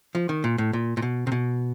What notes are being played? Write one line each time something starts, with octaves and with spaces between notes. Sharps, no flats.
F3
D#3
A#2
A2
A#2
A#2
B2
C3
B2